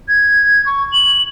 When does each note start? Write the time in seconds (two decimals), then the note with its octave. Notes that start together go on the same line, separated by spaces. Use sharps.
0.09 G#6
0.66 C#6
0.93 F#7